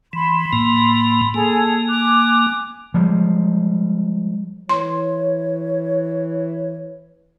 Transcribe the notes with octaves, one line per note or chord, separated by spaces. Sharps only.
E3 B5 C6
A2 A#3
A#3 G#4 A4 G#5
G#5 D6 F#6
F3 G3 G#3
E3 C#5 C6